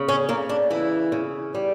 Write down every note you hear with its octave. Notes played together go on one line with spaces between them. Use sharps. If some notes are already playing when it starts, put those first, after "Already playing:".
Already playing: C#3
C#4
C#3 A#3
D4
E3 E4
C#3
G3